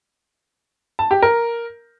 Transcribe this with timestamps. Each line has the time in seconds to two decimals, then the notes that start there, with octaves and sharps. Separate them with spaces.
0.99 A5
1.11 G4
1.22 A#4